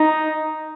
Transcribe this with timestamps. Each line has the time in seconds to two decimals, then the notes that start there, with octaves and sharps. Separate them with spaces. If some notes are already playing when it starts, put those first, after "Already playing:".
Already playing: D#4